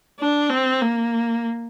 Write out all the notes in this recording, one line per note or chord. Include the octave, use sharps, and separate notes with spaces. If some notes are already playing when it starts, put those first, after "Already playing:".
D4
C4
A#3